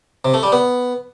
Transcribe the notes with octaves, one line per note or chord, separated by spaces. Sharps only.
C3
A3
G3
B3